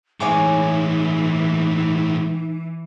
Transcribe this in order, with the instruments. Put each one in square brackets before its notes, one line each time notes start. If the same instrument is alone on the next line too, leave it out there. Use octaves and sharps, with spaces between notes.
[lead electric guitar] A2 G#3 [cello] E3 [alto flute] D#4 [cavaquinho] C#5 G#5 D6